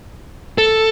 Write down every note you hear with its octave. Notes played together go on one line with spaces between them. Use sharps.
A4